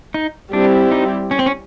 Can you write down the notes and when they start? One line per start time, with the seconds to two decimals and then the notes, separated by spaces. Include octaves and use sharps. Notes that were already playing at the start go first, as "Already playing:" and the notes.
0.14 D#4
0.52 G3 C4 D4 E4 G4
0.92 D#4
1.31 C#4
1.39 C4
1.46 C#4